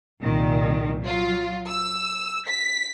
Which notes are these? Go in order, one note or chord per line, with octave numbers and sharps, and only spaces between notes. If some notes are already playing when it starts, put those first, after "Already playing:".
C2 A#2 D#3
F#3 F4
E6
B6